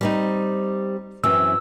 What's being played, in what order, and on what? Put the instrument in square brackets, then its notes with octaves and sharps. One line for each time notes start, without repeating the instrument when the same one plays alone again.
[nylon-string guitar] G3 C4 D#4
[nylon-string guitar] F#2 E3 C4 [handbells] E6